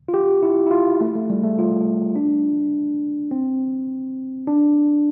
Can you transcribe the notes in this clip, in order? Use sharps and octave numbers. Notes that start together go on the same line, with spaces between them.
F4
G4
E4
E4
F4
A3
A3
G3
A3
F4
D4
C4
D4